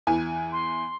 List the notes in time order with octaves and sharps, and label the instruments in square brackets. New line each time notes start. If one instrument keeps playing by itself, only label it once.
[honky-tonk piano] E2 E3 G#5
[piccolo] C6